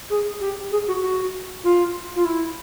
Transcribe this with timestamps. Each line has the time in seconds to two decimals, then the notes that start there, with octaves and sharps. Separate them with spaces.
0.10 G#4
0.41 G4
0.71 G#4
0.87 F#4
1.02 F#4
1.64 F4
2.16 F4
2.25 E4